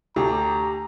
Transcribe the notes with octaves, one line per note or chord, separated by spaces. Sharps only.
D2 G4 A#5